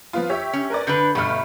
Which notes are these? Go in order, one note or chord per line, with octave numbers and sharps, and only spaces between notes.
F3 B3 F4
G4 C#5 E5
C#4
A#4 B4 D5
D3 D4 B4 G6
G1 B2 A3 B5 F6